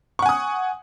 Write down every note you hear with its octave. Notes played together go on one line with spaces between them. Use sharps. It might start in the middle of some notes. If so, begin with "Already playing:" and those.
F#5 G#5 C#6 D#6